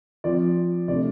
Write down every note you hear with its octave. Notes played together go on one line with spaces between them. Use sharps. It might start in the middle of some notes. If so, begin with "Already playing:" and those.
F3 C4 D5
C3 A3 D4 D5